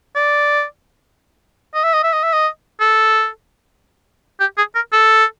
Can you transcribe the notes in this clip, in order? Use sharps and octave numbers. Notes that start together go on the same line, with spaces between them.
D5
D#5
E5
D#5
E5
D#5
E5
D#5
A4
G4
G#4
A#4
A4